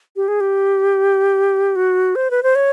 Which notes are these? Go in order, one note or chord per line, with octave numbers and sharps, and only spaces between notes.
G4
G#4
G4
F#4
C5
B4
C5
C#5